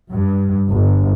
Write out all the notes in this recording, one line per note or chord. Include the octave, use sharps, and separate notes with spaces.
G2
G1